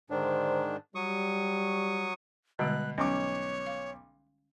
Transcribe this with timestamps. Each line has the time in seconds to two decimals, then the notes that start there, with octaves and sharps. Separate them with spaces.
0.10 G#2 D3 D#3 D4 C5
0.95 F#3 G3 C#6 D#6
2.59 B2 D3 G3 G#3 F#6
2.98 B1 C#4 C#5 C#6 D6
3.66 F5